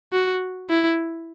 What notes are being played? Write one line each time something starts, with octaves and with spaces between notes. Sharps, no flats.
F#4
E4